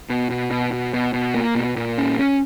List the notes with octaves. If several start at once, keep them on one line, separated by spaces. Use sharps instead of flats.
B2
B2
B2
B2
B2
B2
A#3
B2
A#2
C#4
C#4